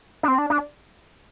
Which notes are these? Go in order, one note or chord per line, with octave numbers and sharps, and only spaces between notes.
D4
C4
D4
D4